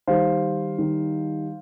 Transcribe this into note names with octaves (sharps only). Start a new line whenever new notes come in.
D#3 G3 D#4 C5 F5
D#3 G3 D#4